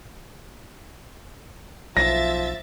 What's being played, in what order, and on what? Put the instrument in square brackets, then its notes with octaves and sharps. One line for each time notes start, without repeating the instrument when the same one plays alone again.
[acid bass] B1 [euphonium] F3 [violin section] E5 A6 [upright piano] A#6